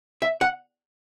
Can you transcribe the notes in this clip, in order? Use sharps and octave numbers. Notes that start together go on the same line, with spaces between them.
E5
F#5